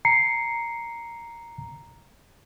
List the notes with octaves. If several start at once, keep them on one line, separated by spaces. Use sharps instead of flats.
A#5 C7 C#7